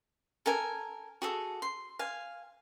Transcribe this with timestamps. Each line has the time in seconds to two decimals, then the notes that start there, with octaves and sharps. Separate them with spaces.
0.46 A4 A#4 G#5
1.22 F#4 G#4 A4
1.62 C6
1.99 F5 G#5